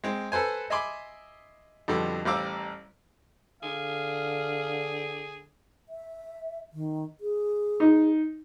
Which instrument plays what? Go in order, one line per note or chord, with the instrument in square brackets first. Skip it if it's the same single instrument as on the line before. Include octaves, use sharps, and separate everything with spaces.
[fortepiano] G#3 C4
A4 B4 C5 G#5
D#5 E5 G#5 B5 C6 D6
F2 B2 D3 G3
A1 G3 C5 F5 D6 E6
[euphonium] D3 [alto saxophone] G#4 [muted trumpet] F5
[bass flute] E5
D#3
G#4
[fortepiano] D#4